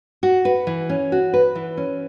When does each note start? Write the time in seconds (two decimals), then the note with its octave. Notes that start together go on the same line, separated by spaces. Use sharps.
0.23 F#4
0.45 B4
0.67 E3
0.89 C#4
1.12 F#4
1.34 B4
1.55 E3
1.77 C#4